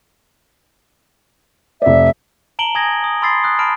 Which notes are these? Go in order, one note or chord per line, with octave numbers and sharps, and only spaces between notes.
F1 D5 E5
A5 A#5 D7 F#7 G7
G#5 D#6 G#6 A#6
D#6
B5 C6 D#6 E6 A6 C7
D#6 F6 F#6
A5 B5 F6 D7